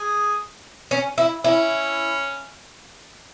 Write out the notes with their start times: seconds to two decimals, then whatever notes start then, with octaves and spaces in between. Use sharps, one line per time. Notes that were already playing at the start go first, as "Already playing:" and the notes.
Already playing: G#4
0.91 C#4
1.18 E4
1.44 C#4 E4